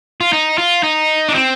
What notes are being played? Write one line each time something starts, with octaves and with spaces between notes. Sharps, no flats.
F4
D#4
F4
D#4
D4
C4